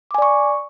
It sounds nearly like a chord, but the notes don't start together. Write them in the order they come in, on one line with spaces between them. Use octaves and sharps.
D6 G#5 D5 C#6